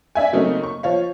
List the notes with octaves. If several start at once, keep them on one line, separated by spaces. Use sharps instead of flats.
D4 E5 G#5
C#3 F#3 A3 A#3 C4 D#4
C#6
F3 C#5 F5